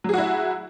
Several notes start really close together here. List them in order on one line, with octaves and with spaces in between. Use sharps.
F#3 G#4 F#4 E4